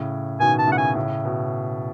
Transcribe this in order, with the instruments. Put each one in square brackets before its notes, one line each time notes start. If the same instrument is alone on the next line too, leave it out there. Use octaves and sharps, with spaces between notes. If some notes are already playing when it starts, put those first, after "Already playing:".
Already playing: [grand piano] A2 C#3
[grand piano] B2 D#3 [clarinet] G#5
[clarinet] A5
[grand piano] A2 C#3 [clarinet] F#5
[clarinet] G#5
[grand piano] A2 C#3
B2